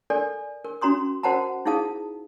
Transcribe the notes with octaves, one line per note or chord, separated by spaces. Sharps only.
A4 A#4 D5 G#5
A#4
C#4 F#4 A#5 C6 D#6
F#4 A#4 C5 F#5 A5 A#5
D#4 E4 G#4 F5 A5 D#6